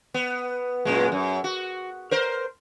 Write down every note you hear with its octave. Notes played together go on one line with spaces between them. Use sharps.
B3
F#2 A#2 G#3
F#2
F#4
A#4 C5